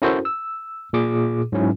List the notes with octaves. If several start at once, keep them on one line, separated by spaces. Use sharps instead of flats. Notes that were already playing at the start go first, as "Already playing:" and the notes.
C#4 E4 F#4 A4 A#4 C5
E6
A#2 G#4 D6
G#2 F#3 C#4 E4